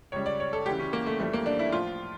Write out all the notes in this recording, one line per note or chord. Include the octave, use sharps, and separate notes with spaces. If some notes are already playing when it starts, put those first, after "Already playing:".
C#2 C#3 G3 C#5
D5
C#5
A4
D2 C#3 E3 G4
C#4
A#3
A3
F2 E3 G3 A3
A#3
D4
E4
A2 F3 F4